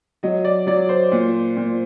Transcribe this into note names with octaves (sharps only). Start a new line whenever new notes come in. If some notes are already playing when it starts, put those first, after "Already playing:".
F#3 D#5
D5
F#3 D5
C5
A#2
A#2